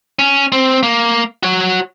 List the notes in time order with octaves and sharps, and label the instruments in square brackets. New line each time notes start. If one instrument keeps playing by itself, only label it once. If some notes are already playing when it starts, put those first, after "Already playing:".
[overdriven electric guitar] C#4
C4
A#3
F#4 C#5